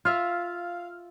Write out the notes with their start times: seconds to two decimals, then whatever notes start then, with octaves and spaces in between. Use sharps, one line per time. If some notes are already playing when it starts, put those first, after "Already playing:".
0.05 F4 E5 F5 F6